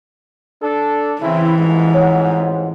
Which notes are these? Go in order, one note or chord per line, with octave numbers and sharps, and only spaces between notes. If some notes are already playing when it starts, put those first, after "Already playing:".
D4 A4
C#3 E3 C4 E4
A1 F2 G#2
C#5 F#5